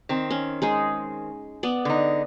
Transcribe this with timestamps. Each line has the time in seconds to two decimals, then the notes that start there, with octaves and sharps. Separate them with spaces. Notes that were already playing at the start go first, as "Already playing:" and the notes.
0.09 D#3 C4
0.31 C#4
0.62 G#3 D#4 G#4
1.63 B3 D5
1.85 D3 D#4